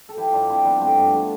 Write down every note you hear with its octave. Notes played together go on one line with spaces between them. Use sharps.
A4
F3 E4 G4
G2 D4 F4
F3 C4 E4
F3 B3 D4
G2 A3 C4
G2 B3
A3